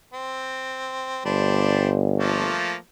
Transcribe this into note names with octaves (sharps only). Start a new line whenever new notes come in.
C4
G1 G3 D4 C5
F3 A3 A#3